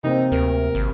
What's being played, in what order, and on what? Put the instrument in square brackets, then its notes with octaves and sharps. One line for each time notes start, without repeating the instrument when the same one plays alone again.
[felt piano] C3 A#3 C4 [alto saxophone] D#4
[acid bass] D2 [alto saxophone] A#4
[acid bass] G#1